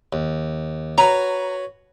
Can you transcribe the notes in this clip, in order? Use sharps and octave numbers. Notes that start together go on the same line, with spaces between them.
D#2
F#4 B4 C#5 A#5